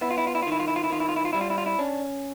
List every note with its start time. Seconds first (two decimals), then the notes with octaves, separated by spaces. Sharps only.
0.01 B3 E4
0.11 F4
0.18 E4
0.27 F4
0.35 E4
0.43 F4
0.47 D#3
0.52 E4
0.60 F4
0.68 E4
0.76 F4
0.84 E4
0.90 D#3 F4
1.00 E4
1.09 F4
1.16 E4
1.25 F4
1.33 G3 E4
1.41 F4
1.50 E4
1.58 F4
1.66 E4
1.79 C#4 D4